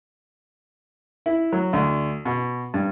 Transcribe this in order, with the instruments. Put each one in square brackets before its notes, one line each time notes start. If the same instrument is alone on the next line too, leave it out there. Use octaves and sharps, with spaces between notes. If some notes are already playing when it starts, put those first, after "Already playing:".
[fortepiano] E4
F#3
D2
B2
G2